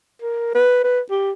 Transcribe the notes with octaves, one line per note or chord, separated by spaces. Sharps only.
A#4
B4
B4
G4